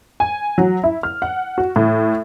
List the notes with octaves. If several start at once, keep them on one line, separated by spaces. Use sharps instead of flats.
G#5
F#3
E4
F6
F#5
F#4
A2